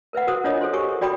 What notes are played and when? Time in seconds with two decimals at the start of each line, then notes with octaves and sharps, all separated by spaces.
0.13 A#4 B4 E5 F#5
0.27 F#4 G#4 A#4 C5 D#6
0.44 D4 F4 C5 C#5 D#5 D#6
0.61 G#4 A4 C5 C6
0.73 G4 A#4 G#5 C#6 D6
1.01 F#4 D5 G5 B5 D6 D#6